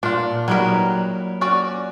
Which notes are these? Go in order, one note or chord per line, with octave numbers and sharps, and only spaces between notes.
A#2 D4 F4
F#3 G3 D#4 A#4 B4
C#4 F#4 D5